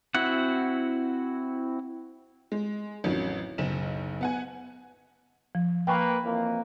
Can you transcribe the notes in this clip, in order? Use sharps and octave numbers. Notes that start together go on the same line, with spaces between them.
C4 E4 F#4 F#5
G#3
A1 F2 D#3 F#3 C#4
F#1 B1 E7
B3 F#5 G#5
F3
A#3 B4 G5 G#5 C#6
F2 E3 A#3